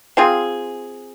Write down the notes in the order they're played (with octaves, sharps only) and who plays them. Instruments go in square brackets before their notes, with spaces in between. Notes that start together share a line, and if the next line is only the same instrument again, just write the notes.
[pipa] C4 F4 G#4